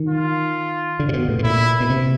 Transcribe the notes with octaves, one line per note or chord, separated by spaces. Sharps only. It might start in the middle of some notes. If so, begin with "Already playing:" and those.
Already playing: D#3
F4
D3
C3
B2
A2
B2
A#2 E4
B2
C3